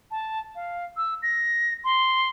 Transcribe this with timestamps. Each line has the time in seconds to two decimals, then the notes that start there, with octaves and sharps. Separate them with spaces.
0.11 A5
0.55 F5
0.97 E6
1.23 A#6
1.84 C6